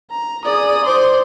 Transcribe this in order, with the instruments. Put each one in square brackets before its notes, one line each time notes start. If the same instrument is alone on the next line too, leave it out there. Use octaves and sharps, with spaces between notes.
[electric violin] A#5
[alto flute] G#4 [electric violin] D5 D#6
[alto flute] C5 [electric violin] C6 D6